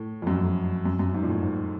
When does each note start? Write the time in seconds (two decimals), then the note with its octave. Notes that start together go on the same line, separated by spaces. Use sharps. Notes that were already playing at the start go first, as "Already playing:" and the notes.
Already playing: A2
0.22 F2
0.27 F#2
0.86 F#2
0.99 F#2
1.14 G#2
1.23 A#2
1.29 A2
1.43 G#2